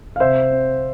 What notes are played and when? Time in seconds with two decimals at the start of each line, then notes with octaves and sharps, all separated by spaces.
0.16 F5
0.20 C3 C5 E5
0.52 C4